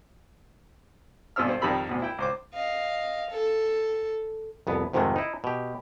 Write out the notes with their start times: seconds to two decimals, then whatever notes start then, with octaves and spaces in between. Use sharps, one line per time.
1.36 G#1 G2 B2 C4 E6 F6
1.49 C4
1.61 F2 D#3 G3 A#4 B5 E6
1.89 D2 B2
2.02 E4 G5
2.19 C#2 C5 D6
2.54 D#5 F5
3.30 A4
4.67 C2 F2 B3
4.93 F2 G#2 C3 D#3 G#3 A3
5.16 D#4 E4
5.44 B2 G4